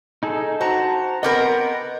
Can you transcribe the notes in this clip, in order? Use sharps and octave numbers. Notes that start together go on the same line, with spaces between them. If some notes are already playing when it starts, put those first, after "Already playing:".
D#4 G#4 A4
F#4 C5 A5 A#5
B3 C4 A#4 D#5 D6 F6